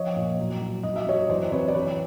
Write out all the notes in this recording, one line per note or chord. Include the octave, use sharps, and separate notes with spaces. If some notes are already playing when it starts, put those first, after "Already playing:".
Already playing: F3 C#5 D#5
A#2
F#3
F#3
F#3 D#5
E5
F#3 C#5 D#5
E3 C5 D5
C3 B4 C#5
D5
E3 B4 C#5